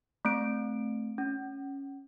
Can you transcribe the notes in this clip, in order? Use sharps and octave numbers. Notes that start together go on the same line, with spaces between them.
A3 C4 D7
C#4